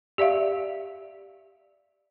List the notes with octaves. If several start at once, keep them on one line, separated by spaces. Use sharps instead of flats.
G4 D5 E5 F5